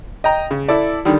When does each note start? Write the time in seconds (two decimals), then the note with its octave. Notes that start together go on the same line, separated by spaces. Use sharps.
0.24 D#5 G5 A#5
0.51 C#3
0.68 E4 A4 D5
1.05 D3 D#3 G3